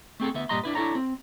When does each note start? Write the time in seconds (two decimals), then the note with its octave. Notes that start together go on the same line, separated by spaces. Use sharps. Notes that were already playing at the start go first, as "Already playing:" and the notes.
0.20 A3 C4 G#4 A4
0.34 D2 B3 E5
0.49 G2 A#2 G3 D#5 A#5 C6
0.63 D4 E4 B4
0.75 D4 E4 G#4 A4 C#5 A#5
0.95 C4